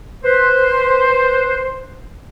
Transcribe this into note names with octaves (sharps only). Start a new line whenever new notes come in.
B4 C5